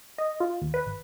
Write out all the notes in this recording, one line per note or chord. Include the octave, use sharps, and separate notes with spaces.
D#5
F4
D#2
B4
G#1